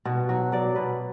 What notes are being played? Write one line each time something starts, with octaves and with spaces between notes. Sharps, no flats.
B2 F#4
F#3 F#4
F#3 D5
B2 B4